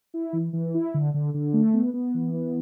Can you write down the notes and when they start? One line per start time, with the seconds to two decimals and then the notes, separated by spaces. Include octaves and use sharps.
0.14 E4
0.33 E3
0.53 E3
0.74 E4
0.94 D3
1.14 D3
1.34 D3
1.53 A3
1.74 B3
1.94 B3
2.14 E3
2.34 B3